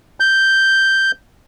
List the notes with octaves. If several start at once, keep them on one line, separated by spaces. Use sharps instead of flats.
G6